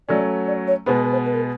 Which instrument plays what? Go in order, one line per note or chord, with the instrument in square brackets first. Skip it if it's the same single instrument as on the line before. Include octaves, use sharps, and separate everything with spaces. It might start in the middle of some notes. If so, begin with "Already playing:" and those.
[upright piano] F#3 A3 C#4 [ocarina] D5
[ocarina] D5
C#5
[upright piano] B2 G#3 B3 [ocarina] C5
[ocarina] B4
C5
B4
A#4